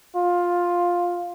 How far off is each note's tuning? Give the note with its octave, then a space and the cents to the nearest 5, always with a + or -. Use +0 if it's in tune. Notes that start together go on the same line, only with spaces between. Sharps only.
F4 +10